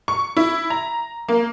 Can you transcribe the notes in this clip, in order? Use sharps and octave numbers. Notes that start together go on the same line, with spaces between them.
C#6
E4
A#5
A#3